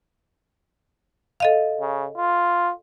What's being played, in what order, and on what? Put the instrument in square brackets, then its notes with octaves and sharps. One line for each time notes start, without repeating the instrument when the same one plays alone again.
[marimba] A4 D#5 F5
[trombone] C#3
F4